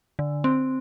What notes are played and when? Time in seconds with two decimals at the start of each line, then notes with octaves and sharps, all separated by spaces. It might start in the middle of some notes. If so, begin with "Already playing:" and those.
0.19 D3
0.44 C4